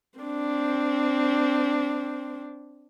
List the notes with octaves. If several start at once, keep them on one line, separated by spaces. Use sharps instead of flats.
C4 D4